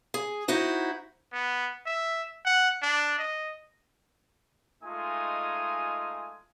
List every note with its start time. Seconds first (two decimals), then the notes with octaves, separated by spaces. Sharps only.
0.14 G#4
0.48 D#4 E4 F#4 C5
1.33 B3
1.86 E5
2.45 F#5
2.82 D4
3.19 D#5
4.83 G#3 A3 D#4 F4 G#5 D#6